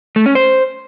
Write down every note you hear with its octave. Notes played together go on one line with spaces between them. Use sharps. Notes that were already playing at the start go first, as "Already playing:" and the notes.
A3
C#4
C5